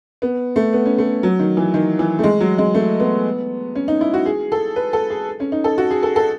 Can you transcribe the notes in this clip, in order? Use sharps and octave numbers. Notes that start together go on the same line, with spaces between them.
B3
A3
B3
C#4
A3
F#3
D#3
E3
D#3
E3
A3
G#3
F#3
G#3
A3
B3
C#4
D#4
E4
F#4
G#4
A4
B4
A4
G#4
C#4
D#4
A4
F#4
G#4
A4
A4